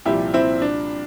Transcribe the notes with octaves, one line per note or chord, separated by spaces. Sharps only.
C2 A#2 F3 E4 G4
C4 E4
D4